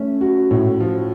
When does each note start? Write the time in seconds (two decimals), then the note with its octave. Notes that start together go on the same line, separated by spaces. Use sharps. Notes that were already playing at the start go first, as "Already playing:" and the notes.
Already playing: A3 C#4
0.21 F#4
0.51 A2
0.80 F3